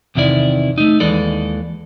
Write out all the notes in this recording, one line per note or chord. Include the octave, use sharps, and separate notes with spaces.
E2 C3 D#3 E4 D5
A3 D#4
D#2 E3 G#3 A4 D5